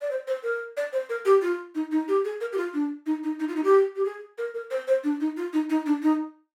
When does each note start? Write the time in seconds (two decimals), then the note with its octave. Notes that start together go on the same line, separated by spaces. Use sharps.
0.02 D5
0.11 C5
0.27 C5
0.43 A#4
0.77 D5
0.93 C5
1.09 A#4
1.25 G4
1.42 F4
1.75 D#4
1.92 D#4
2.08 G4
2.25 G#4
2.41 A#4
2.52 G4
2.58 F4
2.74 D4
3.06 D#4
3.24 D#4
3.40 D#4
3.48 F4
3.56 D#4
3.64 G4
3.96 G4
4.05 G#4
4.38 A#4
4.54 A#4
4.71 C5
4.88 C5
5.04 D4
5.20 D#4
5.37 F4
5.53 D#4
5.70 D#4
5.86 D4
6.02 D#4